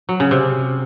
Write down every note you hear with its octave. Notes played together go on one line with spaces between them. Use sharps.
F#3
C#3
C3